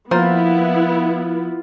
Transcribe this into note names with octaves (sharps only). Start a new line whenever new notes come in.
F3 A#3 B3 E4 F4 C5